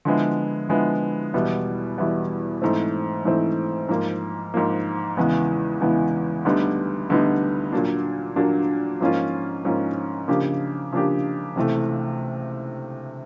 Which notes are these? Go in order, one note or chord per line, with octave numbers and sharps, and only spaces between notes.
D3 F3 G#3 B3 E4
D3 F3 G#3 B3 E4
E2 B2 G3 B3 E4
E2 B2 G3 B3 E4
G#2 E3 A3 C4
G#2 E3 A3 C4
G#2 F3 A#3
G#2 F3 A#3
E2 C#3 E3 G#3 B3
E2 C#3 E3 G#3 B3
D2 D3 G3 B3 D#4
D2 D3 G3 B3 D#4
A#2 F#3 A#3 D4
A#2 F#3 A#3 D4
G#2 F3 A#3 C#4 F4
G#2 F3 A#3 C#4 F4
C#3 F3 A#3 D4 G4
C#3 F3 A#3 D4 G4
C#2 C3 E3 A3